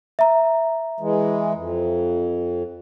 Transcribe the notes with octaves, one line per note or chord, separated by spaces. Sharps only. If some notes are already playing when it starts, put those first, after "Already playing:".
E5 A#5
E3 G#3
F2